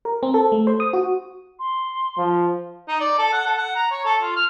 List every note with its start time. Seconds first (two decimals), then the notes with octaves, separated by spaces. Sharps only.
0.05 A#4
0.23 C4
0.34 A4
0.52 A3
0.67 C5
0.80 D#6
0.93 F#4
1.59 C6
2.18 F3
2.88 D#4
3.00 D5
3.19 A4
3.33 F#5
3.46 A4
3.58 F#5
3.76 A#5
3.91 C#5
4.05 A4
4.22 F4
4.36 F6